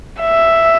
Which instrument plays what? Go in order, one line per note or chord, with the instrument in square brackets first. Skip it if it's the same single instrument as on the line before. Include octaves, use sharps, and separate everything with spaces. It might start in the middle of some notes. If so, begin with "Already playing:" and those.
[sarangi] E5